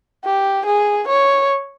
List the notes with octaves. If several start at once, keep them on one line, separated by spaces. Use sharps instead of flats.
G4
G#4
C#5